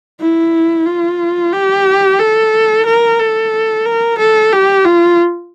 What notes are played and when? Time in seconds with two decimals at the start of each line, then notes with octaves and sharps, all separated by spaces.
0.20 E4
0.86 F4
1.53 G4
2.19 A4
2.86 A#4
3.20 A4
3.86 A#4
4.18 A4
4.52 G4
4.85 F4